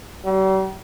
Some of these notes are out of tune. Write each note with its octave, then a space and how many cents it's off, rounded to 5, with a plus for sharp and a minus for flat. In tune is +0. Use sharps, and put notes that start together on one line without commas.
G3 -45